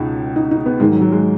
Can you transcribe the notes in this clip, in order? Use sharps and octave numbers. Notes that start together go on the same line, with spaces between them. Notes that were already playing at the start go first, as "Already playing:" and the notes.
Already playing: C#2 B2 D#4
D#4
D#4
B3
G#2 D#3 G#3
F#3
F#3
G#3